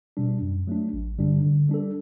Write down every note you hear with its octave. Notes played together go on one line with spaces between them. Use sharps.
B2 G3 D4
F#2
F#3 A3 D4
A1
G2 D3 G3 D4
D3
G3 D4 A4